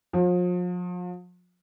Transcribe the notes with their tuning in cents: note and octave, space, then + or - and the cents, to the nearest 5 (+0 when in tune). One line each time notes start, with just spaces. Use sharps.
F3 +40